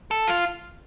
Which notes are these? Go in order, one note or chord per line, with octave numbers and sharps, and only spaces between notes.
A4
F4